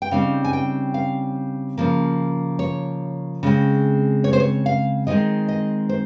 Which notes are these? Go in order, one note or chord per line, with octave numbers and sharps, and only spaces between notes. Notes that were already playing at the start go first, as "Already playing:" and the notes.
G5
C#3 G3 C4 D#4 F5
G#5
G5
F5
C#3 F3 A#3
C#5
C#3 G#3 C4
C#5
C5
C#5
F5
D#3 G#3 C4 D#4 D#5
D#5
C5